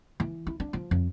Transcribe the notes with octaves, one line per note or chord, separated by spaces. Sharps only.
E3
E4
D4
F3
F2